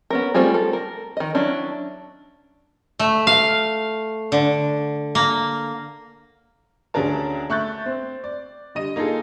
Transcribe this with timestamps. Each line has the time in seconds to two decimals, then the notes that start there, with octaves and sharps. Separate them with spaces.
0.10 B3 C#4 A#4
0.34 G3 A3 C4 F4 G#4
0.54 A4
0.73 A#4
1.17 D#3 D#5
1.34 F#3 C#4 D4 E4
2.99 A3
3.27 F5
4.32 D3
5.15 A#3
6.94 D2 C#4 D4 G#4 A#4 A5
7.50 A3 C#6 F#6 G6 A6
7.86 C4
8.24 D5
8.75 D3 G3 D#5 D#7
8.96 A#3 D#4 F4 G#4 A4